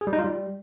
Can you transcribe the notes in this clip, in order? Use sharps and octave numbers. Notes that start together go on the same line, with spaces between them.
G#4
G3
D#4
F4
G3